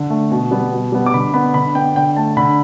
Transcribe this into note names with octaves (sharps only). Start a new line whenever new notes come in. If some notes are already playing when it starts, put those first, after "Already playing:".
Already playing: D3
A3
B2
G3 B3
B2
G3 B3
D6
D3 B5
B3 B5
D3 B5
B3 G5
D3 G5
A3 A5
D3 B5